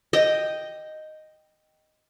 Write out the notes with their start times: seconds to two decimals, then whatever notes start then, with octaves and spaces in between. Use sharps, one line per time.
0.13 D#5 G5